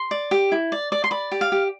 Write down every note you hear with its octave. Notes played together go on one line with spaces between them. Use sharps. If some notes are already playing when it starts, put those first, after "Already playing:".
Already playing: C6
D5
G4
E4
D5
D5
C6
D5 B5
G4
F5
G4